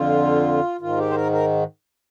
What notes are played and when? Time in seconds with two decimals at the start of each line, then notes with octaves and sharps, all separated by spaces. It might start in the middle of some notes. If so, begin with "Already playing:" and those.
Already playing: F2 D3 F4
0.81 G#2 D#3 F4
0.98 G4
1.10 C5
1.15 A#4
1.32 A#4